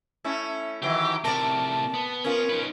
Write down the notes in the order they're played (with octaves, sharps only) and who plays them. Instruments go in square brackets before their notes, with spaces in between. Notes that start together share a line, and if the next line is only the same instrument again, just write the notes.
[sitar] A3 C#4 E4
[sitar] D#3 E3 F#3 [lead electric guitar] G4 G5
[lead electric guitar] A2 C3 [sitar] A#4 D5 [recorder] A5
[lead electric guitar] B3
[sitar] C#4 F4 [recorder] A#4
[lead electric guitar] D#4 B4